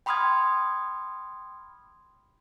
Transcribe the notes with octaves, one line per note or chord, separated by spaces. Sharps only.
G5 B5 C6 D#6 F6 G#6